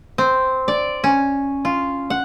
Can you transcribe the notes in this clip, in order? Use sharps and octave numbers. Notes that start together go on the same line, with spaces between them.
C4
D5
C#4
F4
F#5